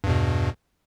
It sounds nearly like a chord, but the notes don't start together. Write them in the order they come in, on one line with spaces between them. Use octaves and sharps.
G2 E2 B2